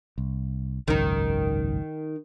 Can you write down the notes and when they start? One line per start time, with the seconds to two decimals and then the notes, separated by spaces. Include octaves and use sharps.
0.18 C2
0.88 G#1 C#2 F#2 D#3 D#4